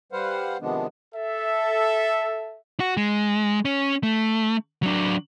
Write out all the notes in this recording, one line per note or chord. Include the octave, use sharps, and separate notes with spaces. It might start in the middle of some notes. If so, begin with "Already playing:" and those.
G3 B4 C5 F5 F#5
C3 D#3 F3 G#3 B3 D4
A4 E5
F#4
G#3
C#4
A3
F#3 D4